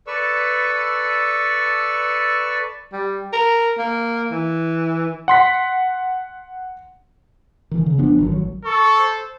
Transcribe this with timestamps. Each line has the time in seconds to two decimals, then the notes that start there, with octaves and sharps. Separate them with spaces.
0.07 A4 B4 D5 C#6 E6
2.93 G3
3.33 A#4
3.78 A#3
4.31 E3
5.28 F#5 C6 B6
7.71 D#3 E3
7.86 C#3
7.98 F1 F3 B3 D4
8.18 G1 D#3 F#3
8.32 A1 F#3
8.65 A4 C#6
8.98 C5